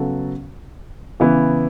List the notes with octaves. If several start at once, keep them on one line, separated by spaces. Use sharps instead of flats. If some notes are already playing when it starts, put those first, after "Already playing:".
Already playing: C#3 F#3 B3 F#4 A4
C#3 E3 B3 E4